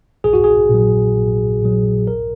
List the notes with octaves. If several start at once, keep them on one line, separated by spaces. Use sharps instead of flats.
A#1 G#4
F#4
G#4
A#2 F#3
A#1
A#2 F#3
A#1 A#4